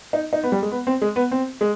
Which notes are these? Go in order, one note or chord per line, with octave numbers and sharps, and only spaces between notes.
D#4
D#4
B3
G3
G#3
B3
C4
G#3
B3
C4
G#3